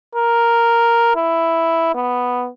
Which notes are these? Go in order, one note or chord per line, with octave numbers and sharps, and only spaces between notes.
A#4
E4
B3